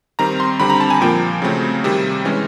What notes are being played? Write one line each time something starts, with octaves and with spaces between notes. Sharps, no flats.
D#3 G3 C4 A#5
C6
D3 G3 C4 B5
A#5
A5
G#5
A#2 F3 A#3 G5
C#3 F#3 A3 C4
C3 D#3 G3
E3 G#3 C#4